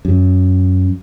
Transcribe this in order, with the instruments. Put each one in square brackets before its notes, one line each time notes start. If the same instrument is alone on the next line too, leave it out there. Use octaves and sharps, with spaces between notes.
[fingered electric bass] F#2